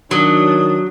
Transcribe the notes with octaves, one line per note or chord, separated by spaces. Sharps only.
D#3 F#3 D4 D#6